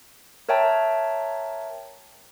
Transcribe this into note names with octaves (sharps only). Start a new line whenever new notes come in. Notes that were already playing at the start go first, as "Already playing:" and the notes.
A#4 C#5 E5 G5 A5 A#5